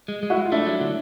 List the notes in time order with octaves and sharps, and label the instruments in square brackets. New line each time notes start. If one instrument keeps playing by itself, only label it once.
[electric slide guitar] G#3
G#3
[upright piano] E4 F#4
[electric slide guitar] G#3
[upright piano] F4
[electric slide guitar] A3 [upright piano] D4 E4
[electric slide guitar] F#3
D3